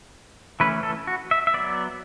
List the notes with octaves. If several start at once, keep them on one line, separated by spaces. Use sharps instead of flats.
E3 A3 C#4 B4
A4
F#4
E5
E5
F#3 B3 D5